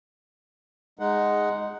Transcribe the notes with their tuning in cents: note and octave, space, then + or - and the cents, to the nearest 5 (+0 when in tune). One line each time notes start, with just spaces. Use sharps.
G#3 +0 D#4 +0 F#5 +0